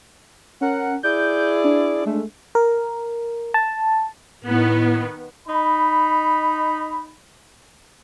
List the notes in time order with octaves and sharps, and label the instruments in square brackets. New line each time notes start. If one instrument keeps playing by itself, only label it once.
[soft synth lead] C#4 [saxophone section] A#4 F#5
[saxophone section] E4 G#4 D5 [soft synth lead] G6
[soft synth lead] D4
[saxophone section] G#3 A3
[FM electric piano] A#4
A5
[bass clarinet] A2 [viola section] D#3 B3
[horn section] D#4 B5